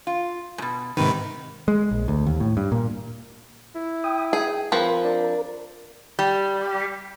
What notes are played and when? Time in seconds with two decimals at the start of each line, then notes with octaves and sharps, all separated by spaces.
0.07 F4
0.58 G#2 B2
0.97 G#2 C3 D#3 B4
1.68 G#3
1.91 A#1
2.08 D2
2.26 D#2
2.40 A2
2.57 G2
2.72 A#2
3.75 E4
4.04 G5 D#6
4.33 G#4 G5
4.72 F3 C4 A#4 B4
5.04 D4
6.19 G3